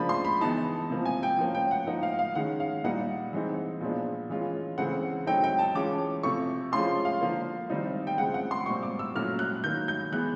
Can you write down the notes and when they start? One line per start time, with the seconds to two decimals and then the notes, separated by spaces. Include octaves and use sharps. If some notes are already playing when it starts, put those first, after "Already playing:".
Already playing: C#3 F3 A#3 D4 B5
0.09 C6
0.25 B5
0.41 E3 G#3 B3 D#4 A5
0.90 C3 F3 A#3
1.05 G#5
1.23 G5
1.38 F3 A#3 C#4
1.55 G5
1.71 F#5
1.87 F3 A#3 D#4 F#5
2.03 F5
2.19 F5
2.35 D#3 G#3 C#4 F#5
2.60 F5
2.84 A#2 G3 A#3 D#4 F#5
3.33 E3 G#3 C4 D#4
3.81 A#2 F3 G#3 B3 D4
4.30 E3 G#3 C#4 F4
4.78 C#3 E3 A3 C4 F#5
5.27 F#3 A3 C4 D#4 G5
5.44 G5
5.59 A5
5.75 E3 G#3 C#4 F4 D6
6.23 C3 F3 A3 C#6
6.72 F3 G#3 C#4 F4 C6
7.05 F5
7.21 D3 F3 A#3
7.70 D#3 G3 C4 D#4
8.07 G5
8.18 C#3 F3 G#3 C4 F#5
8.34 F#5
8.51 C6
8.66 A#2 G3 C4 C#6
8.83 D6
8.99 E6
9.15 A#2 F#3 A3 C#4 F6
9.39 F#6
9.64 D#3 F#3 A#3 G6
9.88 G6
10.12 E3 G#3 B3 F#6